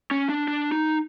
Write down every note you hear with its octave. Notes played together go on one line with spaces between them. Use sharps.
C#4
D4
D4
D#4